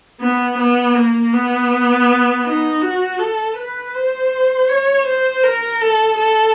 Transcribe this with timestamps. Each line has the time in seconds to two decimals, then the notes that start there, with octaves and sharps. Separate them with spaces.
0.21 B3
0.58 B3
0.95 A#3
1.33 B3
2.45 D#4
2.81 F#4
3.19 A4
3.57 B4
3.94 C5
4.69 C#5
5.06 C5
5.43 A#4
5.81 A4
6.18 A4